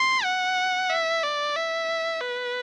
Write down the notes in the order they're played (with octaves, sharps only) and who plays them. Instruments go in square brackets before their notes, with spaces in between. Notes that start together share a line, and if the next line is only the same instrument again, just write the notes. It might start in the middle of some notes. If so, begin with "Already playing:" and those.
Already playing: [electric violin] C6
F#5
E5
D5
E5
B4